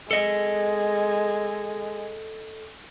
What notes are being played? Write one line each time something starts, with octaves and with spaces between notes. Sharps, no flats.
G#3 A4 D#5